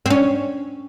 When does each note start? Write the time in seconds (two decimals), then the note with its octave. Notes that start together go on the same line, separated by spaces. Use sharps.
0.06 C4
0.10 C#4